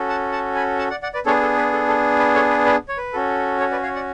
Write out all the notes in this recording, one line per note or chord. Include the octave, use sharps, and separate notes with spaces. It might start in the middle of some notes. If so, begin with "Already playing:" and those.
Already playing: C#4 F#4 A4
F#5 A5
F#5 A5
G#5 B5
F#5 A5
D5 F#5
D5 F#5
B4 D5
B3 D4 G#4 A4 C#5
A4
B4
A4
A4
B4
A4 C#5
B4
B4 D5
C#5
B4
C#4 F#4 A4
A4 C#5
B4 D5
C#5 F5
D5 F#5